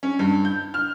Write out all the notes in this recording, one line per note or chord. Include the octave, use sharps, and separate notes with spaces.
C#4
G2
G6
F6